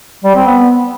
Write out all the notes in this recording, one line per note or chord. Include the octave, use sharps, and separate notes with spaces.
G3
C4
B3